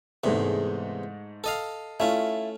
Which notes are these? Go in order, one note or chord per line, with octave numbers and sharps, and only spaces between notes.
E2 G#2 C3 G#3 A3
A4 D#5 F5
A3 C#4 E4 F4